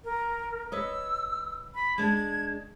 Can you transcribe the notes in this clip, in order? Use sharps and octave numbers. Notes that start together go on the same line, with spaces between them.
A#4
B4 C#5 D#5 E6
B5
G#3 D4 G#6